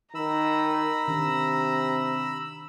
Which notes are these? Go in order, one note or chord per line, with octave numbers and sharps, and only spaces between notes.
D#3 A#5 B5 E6
C3 D#3 D4